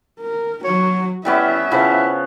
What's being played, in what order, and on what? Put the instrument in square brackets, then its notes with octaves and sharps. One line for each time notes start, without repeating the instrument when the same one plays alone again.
[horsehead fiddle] A#4
[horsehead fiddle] F#3 F#4 [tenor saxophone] C#5
[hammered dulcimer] G3 B3 C#4 [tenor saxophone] E4 [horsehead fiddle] E5
[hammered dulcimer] C#3 F3 B3 [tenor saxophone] E4